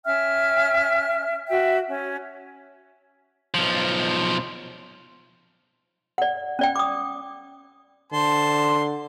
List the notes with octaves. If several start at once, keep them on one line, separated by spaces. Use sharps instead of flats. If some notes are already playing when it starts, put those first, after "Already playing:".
C#4 E5 G5 F6
F#4 E5 G5
C#4
B1 F3
D5 F#5
C#4 D5 G5
D6 D#6
D3 C5 A5 C6